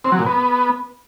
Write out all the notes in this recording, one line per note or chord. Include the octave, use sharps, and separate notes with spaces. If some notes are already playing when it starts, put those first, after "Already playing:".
C4
F#3
A#2
B3